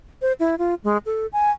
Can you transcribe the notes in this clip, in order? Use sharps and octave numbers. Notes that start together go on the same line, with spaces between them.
C5
E4
F4
G#3
A4
G#5